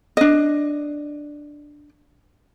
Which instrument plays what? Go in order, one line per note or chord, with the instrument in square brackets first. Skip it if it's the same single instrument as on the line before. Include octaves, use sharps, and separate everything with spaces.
[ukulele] D4 D#5